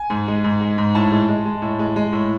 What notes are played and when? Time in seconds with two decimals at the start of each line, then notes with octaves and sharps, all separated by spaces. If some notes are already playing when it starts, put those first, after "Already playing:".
Already playing: G#5
0.10 G#2
0.28 G#3
0.44 G#2
0.61 G#3
0.78 G#2
0.95 A2 A5
1.12 G#3
1.29 G#3
1.45 G#3
1.62 A2
1.79 G#3
1.96 G#3
2.12 A2